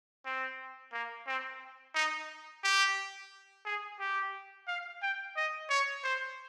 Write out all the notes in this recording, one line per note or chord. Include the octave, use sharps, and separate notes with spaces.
C4
A#3
C4
D#4
G4
G#4
G4
F5
G5
D#5
C#5
C5